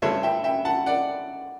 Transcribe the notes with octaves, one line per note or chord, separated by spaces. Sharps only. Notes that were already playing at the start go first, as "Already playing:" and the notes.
G2 D3 A3 C#5 E5
E5 G5
E5 G5
F#5 A5
D5 F#5